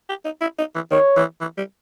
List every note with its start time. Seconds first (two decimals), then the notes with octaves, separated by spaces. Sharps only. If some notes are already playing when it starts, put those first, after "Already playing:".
0.09 G4
0.25 D#4
0.41 E4
0.59 D#4
0.75 E3
0.91 D#3 C#5
1.17 E3
1.41 E3
1.58 G3